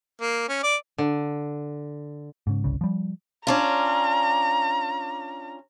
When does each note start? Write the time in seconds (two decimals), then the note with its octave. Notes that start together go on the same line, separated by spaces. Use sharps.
0.21 A#3
0.49 C#4
0.63 D5
0.98 D3
2.47 G#2 C#3
2.64 G1 C2 C#3
2.81 F3 G3
3.47 C#4 D4 F4 A#5